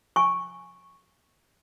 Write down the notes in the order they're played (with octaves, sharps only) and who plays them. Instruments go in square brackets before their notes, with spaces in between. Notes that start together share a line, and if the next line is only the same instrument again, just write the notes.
[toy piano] G#5 C#6